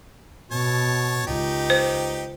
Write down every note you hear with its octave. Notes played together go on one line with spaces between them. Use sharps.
B2 C#5 A5
C#2 D#4 G4
C5